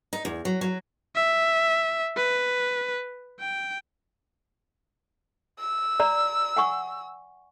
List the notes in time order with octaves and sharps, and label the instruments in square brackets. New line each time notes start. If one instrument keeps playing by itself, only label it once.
[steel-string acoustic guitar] D#4
E2
F#3
F#3
[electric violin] E5
B4
G5
[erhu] E6
[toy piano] D5 A#5
F#5 G#5 C#6